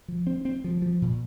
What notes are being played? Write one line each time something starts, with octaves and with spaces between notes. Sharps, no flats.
F3
C4
C4
F3
F3
A#2